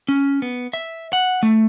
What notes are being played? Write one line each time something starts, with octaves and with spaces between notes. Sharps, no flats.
C#4
B3
E5
F#5
A3